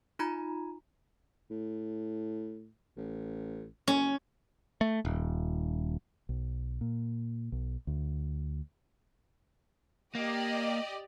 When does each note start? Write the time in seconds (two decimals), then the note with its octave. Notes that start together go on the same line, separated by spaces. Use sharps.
0.19 D#4 F4 A#5 B5 G#6
1.51 A2
2.97 A1
3.88 F#1 C#4
4.81 A3
5.05 D#1
6.29 B1
6.81 A#2
7.52 B1
7.87 D2
10.15 A#3 G4 D5 D#5